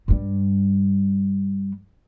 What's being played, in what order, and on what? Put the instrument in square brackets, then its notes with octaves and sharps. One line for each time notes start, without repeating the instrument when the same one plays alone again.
[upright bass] G2 G3